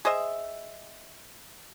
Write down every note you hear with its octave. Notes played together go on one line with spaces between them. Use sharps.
G#4 C5 D#5 E5